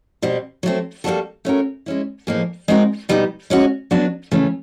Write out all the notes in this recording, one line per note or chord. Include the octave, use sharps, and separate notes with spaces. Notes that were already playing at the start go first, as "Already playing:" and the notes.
B2 G3 C4
F#3 A3 C4
G3 A#3 D4 F#4 A4
A3 C#4 F#4 A#4
G#3 C#4 E4
A2 F3 A#3 D#4 G#4
G#3 C4 D#4 F#4 A#4
B2 G3 B3 D#4
G#3 C#4 F#4
F#3 B3 D4 F#4
C#3 E3 A3 C#4